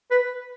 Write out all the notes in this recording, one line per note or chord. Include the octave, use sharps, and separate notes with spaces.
B4